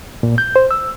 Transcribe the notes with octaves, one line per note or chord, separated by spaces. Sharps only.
A#2
G6
C5
E6